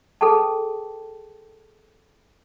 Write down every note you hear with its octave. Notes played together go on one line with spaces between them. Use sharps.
G#4 A4 B4 G5 A5